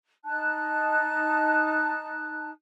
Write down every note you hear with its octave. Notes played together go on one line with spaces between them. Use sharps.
D#4 A5 F#6